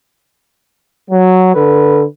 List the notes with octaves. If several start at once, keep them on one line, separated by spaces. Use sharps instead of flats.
F#3
D3 A4 B4